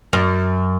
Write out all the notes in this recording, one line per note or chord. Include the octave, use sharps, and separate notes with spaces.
F#2